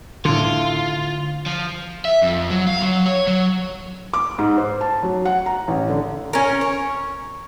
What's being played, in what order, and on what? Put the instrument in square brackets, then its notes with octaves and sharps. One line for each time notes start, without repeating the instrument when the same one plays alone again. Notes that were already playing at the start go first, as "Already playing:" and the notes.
[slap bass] A2 D3 [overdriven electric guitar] F4
[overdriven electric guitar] F3
E5
F2
F#3
F5
F#3
C#5
F#3
[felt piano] D6
G#2
C5
A5
F#3
F#5
A#5
A1
D3
[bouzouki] C#4 A#4
C#5